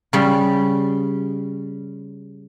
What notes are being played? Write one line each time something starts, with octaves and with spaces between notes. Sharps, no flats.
C#3 G3